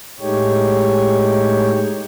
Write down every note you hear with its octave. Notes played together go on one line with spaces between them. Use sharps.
A2 G#3 A3 D#4 G4 C#5